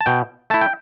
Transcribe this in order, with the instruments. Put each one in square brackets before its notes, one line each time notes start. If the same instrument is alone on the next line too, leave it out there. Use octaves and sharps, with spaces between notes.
[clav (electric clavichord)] A5
B2 G5
A3 E4 A5
G5